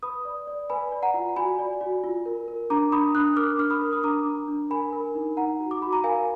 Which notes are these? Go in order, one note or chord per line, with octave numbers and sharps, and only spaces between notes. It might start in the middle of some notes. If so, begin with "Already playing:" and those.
B4 B5 D#6
D5
D5
B4 G#5 B5
D5
F#5 A#5
F4
F#4 G#5 B5
D5
F#4
F4
A#4
A#4
D4 A#5 D6
D4 B5 D#6
D4 D#6 F#6
A#4 D6 F6
D4 F6
B5 D#6
A#4
D#6
D4 A#5 D6
D4
D4
A#4 G#5 B5
A#4
D#4
D#4 F#5 A#5
F#4
D6
F#4 B5
A#5
A#4 F5 G#5